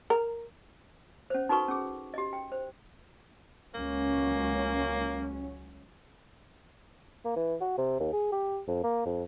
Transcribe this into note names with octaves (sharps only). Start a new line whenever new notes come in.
A#4
C#4 C5
D#4 F#4 A4 B4 C#6
C#4 G#4
G4 D#5
G5
C5
C#2 F#3 A#3 C#4
A#3
E3
F#4
C3
D#2
G#4
G4
F2
A#3
F2